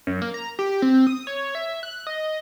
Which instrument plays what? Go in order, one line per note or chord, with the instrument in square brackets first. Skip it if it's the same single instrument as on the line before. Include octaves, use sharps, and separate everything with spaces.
[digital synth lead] F#2
A#3
A#5
G4
C4
D#6
C#5
E5
F#6
D#5